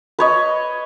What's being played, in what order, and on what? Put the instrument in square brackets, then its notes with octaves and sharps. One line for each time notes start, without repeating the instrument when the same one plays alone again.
[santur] B4 C#5 D#5